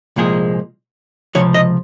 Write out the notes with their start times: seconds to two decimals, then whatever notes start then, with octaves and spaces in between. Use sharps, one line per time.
0.16 C2 A#2 F3 G#3 G#4
1.35 C#2 C3 F3 C#5
1.54 D#5